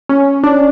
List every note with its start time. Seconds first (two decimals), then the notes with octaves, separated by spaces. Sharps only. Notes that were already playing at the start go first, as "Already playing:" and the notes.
0.09 C#4
0.44 D4